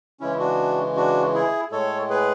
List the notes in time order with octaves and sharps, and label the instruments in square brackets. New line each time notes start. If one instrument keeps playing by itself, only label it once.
[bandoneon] C#3 E3 G#3 C#4 E4
D4 F#4
D4 F#4
E4 G#4
A2 G#3 A4 C#5
G#4 B4